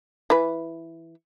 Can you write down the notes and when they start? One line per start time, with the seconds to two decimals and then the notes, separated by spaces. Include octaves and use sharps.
0.30 E3 B4